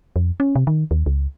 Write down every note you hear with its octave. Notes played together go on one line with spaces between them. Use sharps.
F2
C#4
C3
D#3
D#2
C#2